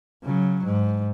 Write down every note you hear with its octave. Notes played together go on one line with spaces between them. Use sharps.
C#3 F#3
G#2